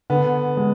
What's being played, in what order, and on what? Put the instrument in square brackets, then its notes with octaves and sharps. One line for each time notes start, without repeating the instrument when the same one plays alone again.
[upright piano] D3 [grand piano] B3
[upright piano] G#3